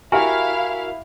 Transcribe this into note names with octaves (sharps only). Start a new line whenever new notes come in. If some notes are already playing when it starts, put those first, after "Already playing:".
E4 F#4 G4 A#4 E5 F5 G#5 F6